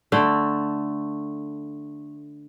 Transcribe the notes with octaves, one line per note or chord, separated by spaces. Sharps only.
D3 A3